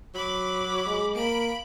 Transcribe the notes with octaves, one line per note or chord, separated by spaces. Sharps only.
F#3 B5 D6
G#3
A#3 B5 D7